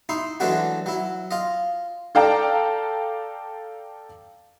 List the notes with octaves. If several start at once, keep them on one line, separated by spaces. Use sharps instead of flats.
D#4 E4 C6
E3 F#3 G#3 A3 D4 F#4
F#3 E4
F4 D#5
A4 D5 F5 G5 A5 A#5